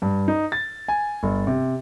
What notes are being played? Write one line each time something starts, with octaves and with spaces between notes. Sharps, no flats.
G2
D#4
A6
G#5
G1
C3